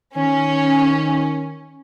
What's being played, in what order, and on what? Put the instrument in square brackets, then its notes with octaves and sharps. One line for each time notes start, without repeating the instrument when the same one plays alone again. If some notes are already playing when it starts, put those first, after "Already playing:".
[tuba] D#3 [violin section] C#4